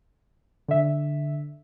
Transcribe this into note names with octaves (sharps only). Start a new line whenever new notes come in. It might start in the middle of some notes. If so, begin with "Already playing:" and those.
D3 E5